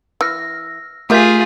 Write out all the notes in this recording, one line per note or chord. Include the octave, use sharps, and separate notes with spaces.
E3 E6 F6 A#6
A3 F4 G4 G#4 A#4 E5 G6 B6